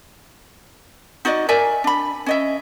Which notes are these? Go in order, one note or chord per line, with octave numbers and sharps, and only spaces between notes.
D#4 F#4 D5 D#5
A#4 D5 E5 G#5
D4 B5
C#4 D#5 E5